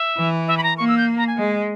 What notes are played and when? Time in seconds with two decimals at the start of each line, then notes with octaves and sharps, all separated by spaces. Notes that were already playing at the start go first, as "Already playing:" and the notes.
Already playing: E5
0.18 E3
0.48 E5
0.57 B5
0.63 A#5
0.78 A#3 C#6
0.88 E6
0.98 G6
1.17 A#5
1.27 G#5
1.37 G#3